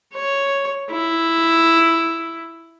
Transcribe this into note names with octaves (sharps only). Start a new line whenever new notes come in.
C#5
E4